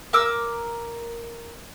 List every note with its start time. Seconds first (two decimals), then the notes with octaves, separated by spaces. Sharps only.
0.13 A#4 D6 E6